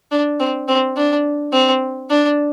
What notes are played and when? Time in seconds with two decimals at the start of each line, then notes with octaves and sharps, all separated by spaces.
0.11 D4
0.40 C4
0.68 C4
0.97 D4
1.53 C4
2.10 D4